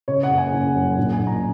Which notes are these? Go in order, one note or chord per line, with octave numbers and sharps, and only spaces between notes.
C#3 C#5
F#5
F#1
G#5
F#1
F#2
A#1
G#5
A#1
A#5